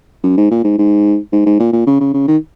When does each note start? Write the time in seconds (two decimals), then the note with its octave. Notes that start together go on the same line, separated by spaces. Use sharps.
0.23 F#2
0.37 G#2
0.51 A#2
0.64 G#2
0.78 G#2
1.32 G#2
1.46 G#2
1.59 A#2
1.73 A#2
1.87 C#3
2.00 C#3
2.14 C#3
2.27 D#3